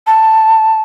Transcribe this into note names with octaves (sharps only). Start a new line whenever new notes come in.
A5